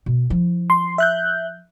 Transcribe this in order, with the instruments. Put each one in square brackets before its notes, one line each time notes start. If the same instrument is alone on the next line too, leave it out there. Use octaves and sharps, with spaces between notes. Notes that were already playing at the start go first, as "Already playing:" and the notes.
[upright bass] B2
F3 E4
[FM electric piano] C6
E5 F#6 G6